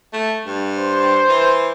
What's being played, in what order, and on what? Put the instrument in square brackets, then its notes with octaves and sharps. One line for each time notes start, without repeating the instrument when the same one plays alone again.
[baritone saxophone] A3
G2
[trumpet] C5
[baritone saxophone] E3